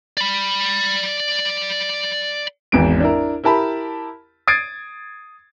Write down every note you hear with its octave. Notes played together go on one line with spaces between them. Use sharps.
D5 B5
G#1 E2 G#2 D7
D4 E4 A#4
E4 G4 A#4 A5 B5
D#6 G#6 A6 C7 D7